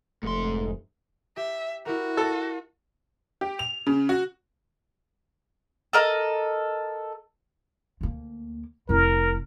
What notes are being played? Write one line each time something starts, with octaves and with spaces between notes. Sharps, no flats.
F1 G#2 A3 C6
G4 E5
E4 F#4 G4 A#4
A4
G4
F7
C#3
F#4
A4 A#4 D#5
D2 A#3
F1 E4 A#4